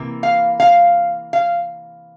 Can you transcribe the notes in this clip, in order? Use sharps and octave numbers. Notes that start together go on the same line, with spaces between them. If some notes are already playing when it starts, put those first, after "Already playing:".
Already playing: C3 E3 A#3
F5
F5
F5